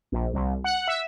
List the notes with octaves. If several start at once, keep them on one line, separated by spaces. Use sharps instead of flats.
A#1
C2
F#5
E5